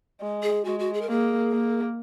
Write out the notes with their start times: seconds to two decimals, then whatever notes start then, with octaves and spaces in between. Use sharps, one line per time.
0.21 G#3
0.43 G#4
0.65 G#3 F#4
0.79 F#4
0.94 G#4
1.02 A#4
1.08 A#3 G#4
1.52 A#3